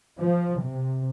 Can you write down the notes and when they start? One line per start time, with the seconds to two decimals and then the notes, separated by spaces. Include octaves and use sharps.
0.18 F3
0.61 C3